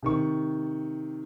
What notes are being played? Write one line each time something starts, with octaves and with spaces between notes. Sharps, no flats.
C3 D#3 C#6